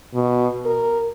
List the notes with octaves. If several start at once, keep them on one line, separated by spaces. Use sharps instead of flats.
B2
A#4